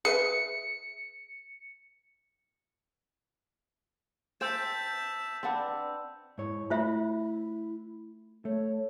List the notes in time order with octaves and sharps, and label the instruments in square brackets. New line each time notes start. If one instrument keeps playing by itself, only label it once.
[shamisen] G#4 B4 E5 [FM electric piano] C#7
[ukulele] C5 G5 [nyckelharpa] E5 A5 [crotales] E6 G6 E7
[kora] C4 D4 B4 [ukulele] D5 F#5
[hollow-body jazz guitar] G#2 C#5 [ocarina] E4
[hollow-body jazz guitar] A3 B5 [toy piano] F4 C5 E5
[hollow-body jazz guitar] A3 A4 [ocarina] C#5